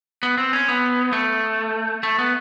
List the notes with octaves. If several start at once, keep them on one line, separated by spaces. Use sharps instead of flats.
B3
C4
C#4
B3
A3
A3
B3